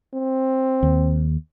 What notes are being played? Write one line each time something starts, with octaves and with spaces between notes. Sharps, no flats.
C4
D#2